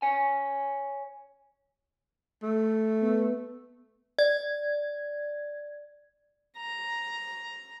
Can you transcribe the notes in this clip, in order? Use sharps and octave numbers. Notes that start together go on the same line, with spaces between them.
C#5 G#5
A3
B3
D5 G#6
A#5